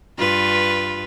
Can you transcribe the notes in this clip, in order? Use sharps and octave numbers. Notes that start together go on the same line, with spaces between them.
G2 F4 B4